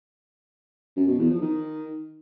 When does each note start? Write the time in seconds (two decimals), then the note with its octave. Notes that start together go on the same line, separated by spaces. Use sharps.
0.96 F#2
1.08 B2
1.19 E2
1.30 F3
1.41 D#3